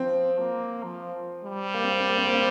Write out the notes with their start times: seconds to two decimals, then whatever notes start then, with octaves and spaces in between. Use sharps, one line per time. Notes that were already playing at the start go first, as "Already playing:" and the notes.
Already playing: F3 C4
0.39 A#3
0.84 F3
1.45 G3
1.74 A#3
1.84 C4
1.91 A#3
2.00 C4
2.09 A#3
2.18 C4
2.27 A#3
2.35 C4